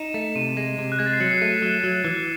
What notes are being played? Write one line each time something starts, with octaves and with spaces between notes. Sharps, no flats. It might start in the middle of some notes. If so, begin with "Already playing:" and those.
Already playing: D#4 E7
A3
C3 D#7
G#3
C3
F#6
G#3 G#6
A6
C7
F#3 C#7
C7
A3 D#7
E7
F#3 E7
F#3
E3